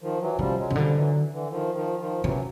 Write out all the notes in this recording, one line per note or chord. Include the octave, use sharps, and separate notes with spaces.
D#3 F3
E3 F#3
C#3 F3 G3
F#3 G#3
C#3
D3 F3 G3
E3 F#3
D3 E3
D#3 F3
D#3 F3
D#3 F3
C#3 E3 F#3